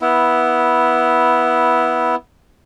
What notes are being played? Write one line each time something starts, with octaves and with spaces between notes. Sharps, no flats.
B3 E4